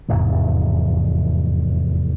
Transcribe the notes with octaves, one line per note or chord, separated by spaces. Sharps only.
F1 E2 G#2 E3